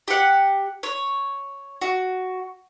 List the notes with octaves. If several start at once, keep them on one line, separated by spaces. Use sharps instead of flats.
G4 F#5
C#5
F#4